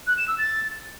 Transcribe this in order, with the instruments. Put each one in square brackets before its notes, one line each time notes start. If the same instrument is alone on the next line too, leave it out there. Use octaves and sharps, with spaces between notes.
[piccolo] F#6
E7
E6
A6